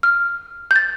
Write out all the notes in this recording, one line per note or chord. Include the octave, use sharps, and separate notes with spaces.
F6
G6
A6